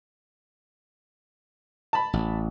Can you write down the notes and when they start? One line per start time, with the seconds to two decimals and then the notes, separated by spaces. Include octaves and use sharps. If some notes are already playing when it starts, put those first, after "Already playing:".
1.93 A5 B5
2.13 A1